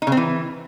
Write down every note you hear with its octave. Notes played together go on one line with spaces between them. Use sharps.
D#4
C#3
C4
E3